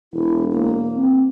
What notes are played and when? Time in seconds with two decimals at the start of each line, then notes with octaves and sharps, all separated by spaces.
0.13 E1 E4
0.52 A#3
0.96 C4